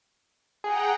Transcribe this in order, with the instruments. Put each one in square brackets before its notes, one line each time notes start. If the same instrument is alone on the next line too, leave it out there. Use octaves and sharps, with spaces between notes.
[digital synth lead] G#4 [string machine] F#5 G5 A#5